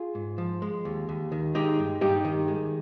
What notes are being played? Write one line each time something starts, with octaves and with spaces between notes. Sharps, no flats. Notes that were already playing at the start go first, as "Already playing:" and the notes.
Already playing: F4 G#4
G#2
F3
G#3
D#2
D#2
D#3
G#3 D#4 G4
G2
G2 D#4 G4
D#3
G#3